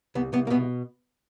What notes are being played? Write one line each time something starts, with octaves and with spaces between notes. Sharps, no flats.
C2 B3
C2 B3
A#3
B2 B3